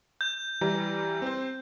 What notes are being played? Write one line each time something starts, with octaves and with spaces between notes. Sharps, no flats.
G6
E3 G3 A#5
C4 C5